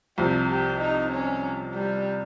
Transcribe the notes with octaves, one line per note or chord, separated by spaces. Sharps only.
C2 C3 F3 G4
G4
D#4
C#4
G3